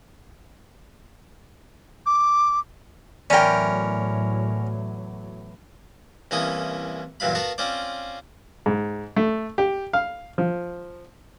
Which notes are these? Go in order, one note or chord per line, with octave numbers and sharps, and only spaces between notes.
D6
E2 A2 F#3 C#4 A#4 D5 G5
C2 E3 A#3 C#4 A#5 D#6
G2 A#2 E3 F#3 F5 B5
B3 F#4 A#4 F5 A5
C4 C#4 F4 C5 D5
G#2
A3
G4
F5
F3